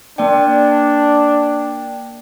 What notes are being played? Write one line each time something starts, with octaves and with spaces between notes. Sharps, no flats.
A#3 D4 D5 G5